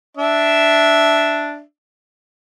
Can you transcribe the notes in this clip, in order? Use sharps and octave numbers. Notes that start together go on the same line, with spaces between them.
D4 E5